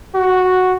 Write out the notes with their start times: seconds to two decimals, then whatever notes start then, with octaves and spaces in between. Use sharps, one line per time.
0.15 F#4